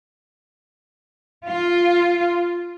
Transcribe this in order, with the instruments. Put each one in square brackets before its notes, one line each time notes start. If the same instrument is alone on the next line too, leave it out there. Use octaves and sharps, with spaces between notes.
[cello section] F4